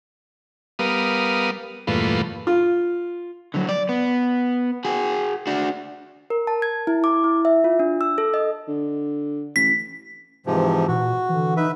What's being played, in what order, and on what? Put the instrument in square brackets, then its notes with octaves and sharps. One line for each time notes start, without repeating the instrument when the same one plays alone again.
[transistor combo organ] G3 B3 A#4 F5 D#6
E2 G2 A#2 A3 F4 B4
[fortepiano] F4
[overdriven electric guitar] D3 F#3
D5
B3
F#4 G#4
D4 F#4
[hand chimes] A#4
A5
G#6
E4
D6
E4
E5
F4
D4
E6
A4
D#5
[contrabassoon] D3
[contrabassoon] A1 [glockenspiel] B6
[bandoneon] G#2 C3 F3 [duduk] E3
[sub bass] A#2 [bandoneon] F#4
[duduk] D3 [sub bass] E3
[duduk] D#4 [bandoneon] B4 E5